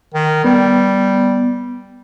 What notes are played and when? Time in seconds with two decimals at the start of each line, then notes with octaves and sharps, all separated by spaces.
0.14 D#3
0.44 G3 B3